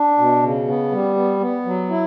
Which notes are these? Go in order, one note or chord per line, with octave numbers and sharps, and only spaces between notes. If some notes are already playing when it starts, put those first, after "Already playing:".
Already playing: D4
B2
C#3
B3
G3
B3
B3
F#3
E4